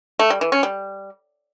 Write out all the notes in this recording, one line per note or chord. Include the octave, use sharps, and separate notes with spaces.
A3
G3
E3
C#4
G3